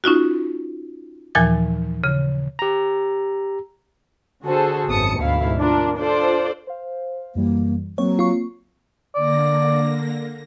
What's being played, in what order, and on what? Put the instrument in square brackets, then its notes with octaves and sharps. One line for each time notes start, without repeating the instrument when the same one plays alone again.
[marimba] C#4 D#4 F4 F#4
D#2 A#2 E3 F3 G#5 A6
C#3
[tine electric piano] G4 A#5
[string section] D3 F#4 G#4 A4 C5
G#1 F#2 B3 A5 D#6 C#7
D2 G#2 B2 E4 F5
D4 F4 A#4
D4 F4 A4 C5 D5
[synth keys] C5 F5
[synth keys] F#2 E3 G3 [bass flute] A#3
[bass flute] F#3 [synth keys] A#3 C4 [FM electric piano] C#5
[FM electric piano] F4 C#6
[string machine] D3 A#3 A#6 [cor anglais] D5